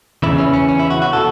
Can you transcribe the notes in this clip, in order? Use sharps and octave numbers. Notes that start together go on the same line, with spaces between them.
E2 C#3 E3 E4
C#4
C#4
C#4
E4
F#4
F#4
B2 A4